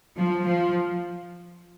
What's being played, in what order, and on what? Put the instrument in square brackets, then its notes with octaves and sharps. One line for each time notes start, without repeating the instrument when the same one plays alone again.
[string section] F3
F3